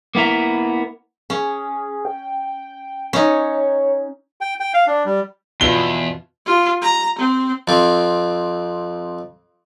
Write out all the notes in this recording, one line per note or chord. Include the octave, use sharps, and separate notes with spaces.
A#3 B3 E4 A#4
C#4 G#4
G5
C#4 D#4 C#5
G5
G5
F5
D4
G3
E2 B2 F4 G7
F4
A#5
C4
F2 C4